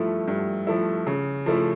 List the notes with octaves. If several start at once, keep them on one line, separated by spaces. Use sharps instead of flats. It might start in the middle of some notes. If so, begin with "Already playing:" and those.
Already playing: G2 F3 A3 E4
G2
F3 A3 E4
C#3
F3 A3 E4